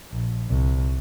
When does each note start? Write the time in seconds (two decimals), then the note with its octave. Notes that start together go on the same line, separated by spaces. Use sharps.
0.11 A#1
0.49 C2